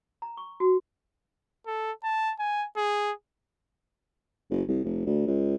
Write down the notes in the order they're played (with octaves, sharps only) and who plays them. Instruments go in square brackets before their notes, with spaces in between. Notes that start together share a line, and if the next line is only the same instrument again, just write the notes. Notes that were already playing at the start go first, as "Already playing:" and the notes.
[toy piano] A#5
C#6
F#4
[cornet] A4
A5
G#5
G#4
[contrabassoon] F#1
C2
F1
D2
C#2